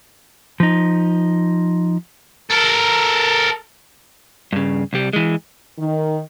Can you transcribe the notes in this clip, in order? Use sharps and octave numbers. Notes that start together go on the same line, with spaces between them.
F3 D#4
A4 A#4
G2 C#3
C2 G3
E3 G#3
D#3